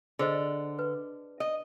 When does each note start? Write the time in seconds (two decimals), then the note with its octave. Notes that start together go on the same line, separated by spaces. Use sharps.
0.19 D3 G#4 C5 D#5
0.79 B4
1.40 D#5